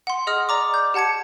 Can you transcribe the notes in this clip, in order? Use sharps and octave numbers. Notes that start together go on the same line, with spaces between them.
F#5 C6
G#4 D#5 D#6 F6
D5 A#5 D6
G6
G4 F#5 A5 G#6 C#7